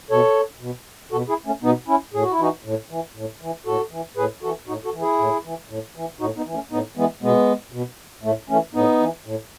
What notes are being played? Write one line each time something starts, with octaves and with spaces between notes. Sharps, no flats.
B2 A4 C#5
B2
B2 F#4 A4
E4 G#4
A3 C#4
B2 B3 D#4
C#4 E4
A2 G#4
F#4
E4
E3 D#4 F#4
A2
E3
A2
E3
A2 F#4 A4
E3
A2 G#4 B4
E3 F#4 A4
A2 D#4 F#4
F#4 A4
E3
E4 G#4
A2
E3
A2
E3
A2 D#4 F#4
B3 D#4
E3
A3 C#4
A2 B3 D#4
E3 G#3 B3
B2 G#3 B3
B2
A2 A3
E3 A3 C#4
A2 B3 D#4
E3
A2